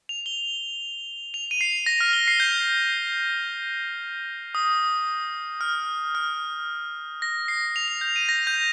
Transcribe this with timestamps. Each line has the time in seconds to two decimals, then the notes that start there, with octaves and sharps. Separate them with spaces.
0.09 F7
0.26 G7
1.34 F7
1.51 D#7
1.61 C7
1.86 A#6
2.00 F6
2.13 G7
2.28 C7
2.40 G6
4.55 D#6
5.61 F6
6.15 F6
7.22 A#6
7.48 C7
7.76 F7
7.88 F7
8.01 G6
8.16 D#7
8.29 A#6
8.47 G6